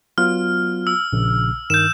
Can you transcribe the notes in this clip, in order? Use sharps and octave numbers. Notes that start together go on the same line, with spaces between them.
F#3 B3 F4 F6
E6
A#1 A#2 C#3
G2 D#3 G6 E7